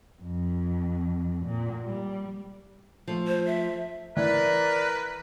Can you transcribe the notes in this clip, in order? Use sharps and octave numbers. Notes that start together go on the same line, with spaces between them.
F2
A#2
G3
F3 A3
C5
E5
E3 A#4 B4 D5